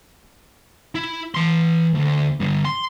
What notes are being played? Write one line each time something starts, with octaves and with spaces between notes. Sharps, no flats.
E4
E3 C6
D2
G2 D3
C6